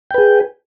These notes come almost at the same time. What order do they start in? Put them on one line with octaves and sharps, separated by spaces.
G5 B4 G#4